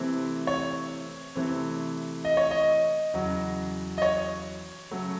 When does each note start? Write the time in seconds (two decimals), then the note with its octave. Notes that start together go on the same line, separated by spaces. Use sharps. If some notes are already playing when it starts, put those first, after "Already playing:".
Already playing: C3 E3 A3 C4
0.47 C#5
1.35 C3 E3 A3 C4
2.25 D#5
2.37 C#5
2.51 D#5
3.13 E2 C#3 F#3
3.98 D#5
4.02 C#5
4.91 C#3 F#3 A3